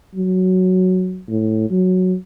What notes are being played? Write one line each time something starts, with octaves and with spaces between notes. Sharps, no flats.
F#3
A2
F#3